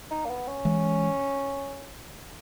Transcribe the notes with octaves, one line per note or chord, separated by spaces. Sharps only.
D#4
A#3
B3
C#4
E3 G#3